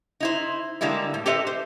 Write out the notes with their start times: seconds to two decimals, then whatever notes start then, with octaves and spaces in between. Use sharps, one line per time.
0.20 D#4 E4 C5
0.81 D3 G3 G#3 A#3 E4
1.14 A2
1.26 G4 A4 B4 C5 D#5 E5
1.47 C5